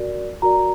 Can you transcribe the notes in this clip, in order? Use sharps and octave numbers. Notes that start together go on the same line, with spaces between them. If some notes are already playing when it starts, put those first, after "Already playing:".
Already playing: F#4 A#4 D5
F#4 A#4 D5 A#5